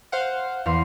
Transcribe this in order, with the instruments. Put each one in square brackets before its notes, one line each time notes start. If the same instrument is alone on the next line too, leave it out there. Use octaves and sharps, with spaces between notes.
[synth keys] C5 F5 F#5
[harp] E2 F5 C6